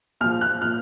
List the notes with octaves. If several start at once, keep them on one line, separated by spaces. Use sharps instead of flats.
A#1 A#2 F3 F6
F#6
A#2 F3 F6